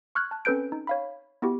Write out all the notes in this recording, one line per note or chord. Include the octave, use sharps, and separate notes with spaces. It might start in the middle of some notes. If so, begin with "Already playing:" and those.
C#6 F6 F#6 G#6
A5 F#6
C4 C#4 A4 B4 G6 D7
D#4
C#5 F5 B5
B3 E4 F#4 G4